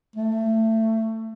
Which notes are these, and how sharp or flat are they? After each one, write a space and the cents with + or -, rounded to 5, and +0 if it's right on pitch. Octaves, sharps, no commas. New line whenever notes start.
A3 +20